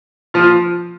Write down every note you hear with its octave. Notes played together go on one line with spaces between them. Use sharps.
F3 F4